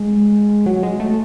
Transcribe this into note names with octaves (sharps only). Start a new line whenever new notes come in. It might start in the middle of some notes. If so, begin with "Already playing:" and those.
Already playing: G#3
F#3
G#3
A3